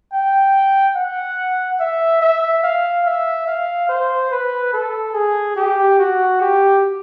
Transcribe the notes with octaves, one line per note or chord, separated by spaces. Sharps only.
G5
F#5
E5
E5
F5
E5
F5
C5
B4
A4
G#4
G4
F#4
G4